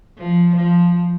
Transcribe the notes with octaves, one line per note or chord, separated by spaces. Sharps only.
F3
F3